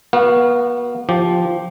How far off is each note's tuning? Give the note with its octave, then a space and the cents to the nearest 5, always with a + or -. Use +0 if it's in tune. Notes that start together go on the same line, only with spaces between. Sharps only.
B3 -40 F#4 +0 F5 +0
F3 +0 G4 +0